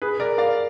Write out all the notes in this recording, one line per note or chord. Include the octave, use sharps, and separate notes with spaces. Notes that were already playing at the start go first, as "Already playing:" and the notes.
G#4 B4
A#4 D5
D5 F5